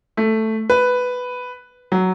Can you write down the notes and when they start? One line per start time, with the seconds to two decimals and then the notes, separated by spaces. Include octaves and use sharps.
0.17 A3
0.70 B4
1.92 F#3